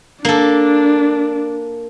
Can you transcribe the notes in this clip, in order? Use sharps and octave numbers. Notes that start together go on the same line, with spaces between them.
A#3 D4 A4